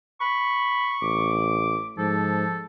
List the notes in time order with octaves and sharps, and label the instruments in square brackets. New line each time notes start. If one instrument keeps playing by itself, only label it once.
[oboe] B5 [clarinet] C#6
[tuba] A1 [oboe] D6
[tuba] G#2 [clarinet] F3 [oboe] A4